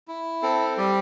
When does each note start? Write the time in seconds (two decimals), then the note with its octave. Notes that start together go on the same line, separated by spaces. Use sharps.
0.08 E4
0.42 C4 A4
0.77 G3 G4